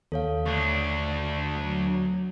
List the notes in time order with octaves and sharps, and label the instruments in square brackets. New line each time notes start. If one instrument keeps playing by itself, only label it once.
[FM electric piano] D#2 [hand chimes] A4 C#5 F5
[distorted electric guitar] D2 D4 [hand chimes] C#6
[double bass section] F#3